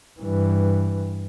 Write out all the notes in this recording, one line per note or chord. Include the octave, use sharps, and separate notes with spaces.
G2 E3